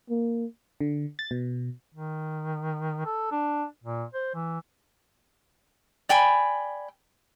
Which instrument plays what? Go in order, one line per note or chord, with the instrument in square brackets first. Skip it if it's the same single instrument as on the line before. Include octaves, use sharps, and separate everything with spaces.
[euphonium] A#3
[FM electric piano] D3
A6
B2
[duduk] D#3
A4
D4
A#2
C5
E3
[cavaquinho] D5 G5 G#5 B5